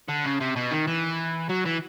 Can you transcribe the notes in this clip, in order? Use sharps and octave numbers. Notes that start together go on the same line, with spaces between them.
D3
C#3
C3
B2
D#3
E3
F#3
E3